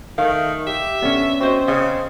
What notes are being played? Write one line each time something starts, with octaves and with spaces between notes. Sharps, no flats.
D#3 A3 F5
G4 E5
D3 B3 C#4
C4 F#4 C5 D#5
C#3 D#5